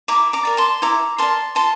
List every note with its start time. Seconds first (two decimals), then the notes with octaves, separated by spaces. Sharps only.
0.08 E4 A#5 D6
0.33 A#5 D6
0.45 A#4 D5
0.57 A5 C6
0.82 E4 A#5 D6
1.18 A#4 D5 A5 C6
1.55 F4 A5 C6